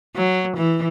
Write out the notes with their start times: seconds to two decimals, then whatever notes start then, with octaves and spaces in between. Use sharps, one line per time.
0.16 F#3
0.57 E3